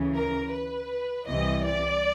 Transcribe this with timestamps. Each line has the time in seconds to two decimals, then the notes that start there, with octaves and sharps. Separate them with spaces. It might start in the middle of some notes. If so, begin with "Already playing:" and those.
Already playing: D2 C#3 E3
0.15 A#4
0.52 B4
1.28 C2 C3 E3 D#5
1.65 D5